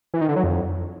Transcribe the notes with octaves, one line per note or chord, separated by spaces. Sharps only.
E3
D#3
D3
F#3
F2